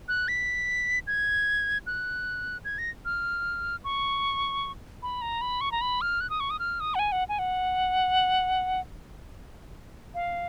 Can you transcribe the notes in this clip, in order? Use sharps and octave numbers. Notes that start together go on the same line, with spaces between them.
F#6
B6
G#6
F#6
G#6
A#6
F6
C#6
B5
A#5
B5
C#6
A#5
B5
F6
F#6
D#6
C#6
D#6
F6
D#6
F#5
G#5
F#5
G#5
F#5
F5